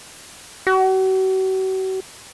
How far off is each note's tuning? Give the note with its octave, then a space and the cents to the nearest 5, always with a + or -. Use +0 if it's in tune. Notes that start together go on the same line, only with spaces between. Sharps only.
F#4 +40